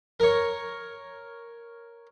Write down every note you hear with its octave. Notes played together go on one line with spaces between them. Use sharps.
A#4 C#5